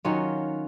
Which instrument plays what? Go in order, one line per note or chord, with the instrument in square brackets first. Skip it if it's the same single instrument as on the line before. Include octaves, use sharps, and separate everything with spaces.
[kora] D#3 F#3 C#4 F4